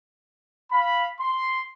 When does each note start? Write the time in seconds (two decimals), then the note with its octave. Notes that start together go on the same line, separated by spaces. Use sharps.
0.71 F5 B5
1.19 C6